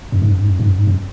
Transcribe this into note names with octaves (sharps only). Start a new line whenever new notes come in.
F#2
G#2
F#2
G#2
F#2
G#2
F#2
G#2
F#2